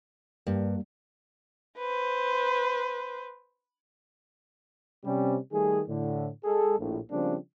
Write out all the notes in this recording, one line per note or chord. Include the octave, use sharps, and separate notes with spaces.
G2 G3 A#3
B4 C5
C3 G3 C#4
D#3 G3 A3 G#4
A2 D3
G#3 G#4 A4
A#1 A2
C#3 F3 G3 A#3 C4 D4